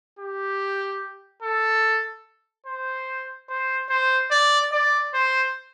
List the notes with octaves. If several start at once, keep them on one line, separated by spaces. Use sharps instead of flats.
G4
A4
C5
C5
C5
D5
D5
C5